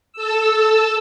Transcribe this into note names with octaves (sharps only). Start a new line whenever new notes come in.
A4 E6